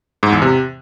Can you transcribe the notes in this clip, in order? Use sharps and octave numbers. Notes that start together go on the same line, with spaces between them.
G#2
E2
C3